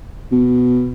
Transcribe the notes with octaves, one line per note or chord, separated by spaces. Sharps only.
B2